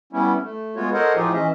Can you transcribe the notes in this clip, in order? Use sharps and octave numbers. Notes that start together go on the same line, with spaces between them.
G3 B3 C#4 E4
A3
G#3 B3 F4 F#4 C#5
A4 A#4 C5 C#5 D#5 F#5
A2 F3 D#4 F4 G4 G#4
E3 C#4 D#5 E5